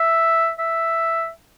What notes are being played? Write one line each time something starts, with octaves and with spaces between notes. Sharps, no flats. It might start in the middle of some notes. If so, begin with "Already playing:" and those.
Already playing: E5
E5